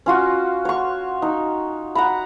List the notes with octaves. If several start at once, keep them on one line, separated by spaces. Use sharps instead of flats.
C#4 F4 F#4
C#5 C#6
D#4
F#5 A#5 B5